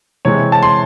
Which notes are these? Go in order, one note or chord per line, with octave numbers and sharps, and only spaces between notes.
C3 E3 G#3 C4 C#5
A5
C6